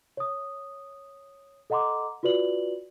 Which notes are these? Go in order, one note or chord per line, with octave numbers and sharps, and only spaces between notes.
C#5 D#6
A4 D#5 F#5 A#5 C6 D6
F4 F#4 B4 D5 F#7